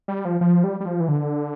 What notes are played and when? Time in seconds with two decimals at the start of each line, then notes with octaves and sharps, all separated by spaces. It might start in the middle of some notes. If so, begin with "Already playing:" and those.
0.08 G3
0.25 F3
0.41 F3
0.64 G3
0.80 G3
0.85 F3
1.00 E3
1.08 D3